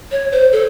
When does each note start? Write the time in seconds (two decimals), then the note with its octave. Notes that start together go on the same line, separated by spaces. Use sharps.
0.12 C#5
0.32 C5
0.53 A4